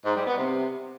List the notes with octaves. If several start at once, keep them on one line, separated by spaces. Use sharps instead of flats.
G#2
G3
B3
C3